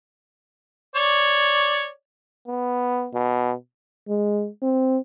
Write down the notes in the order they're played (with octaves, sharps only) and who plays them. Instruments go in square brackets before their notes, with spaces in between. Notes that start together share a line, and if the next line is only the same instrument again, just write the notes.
[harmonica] C#5 D5
[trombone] B3
B2
[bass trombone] G#3
C4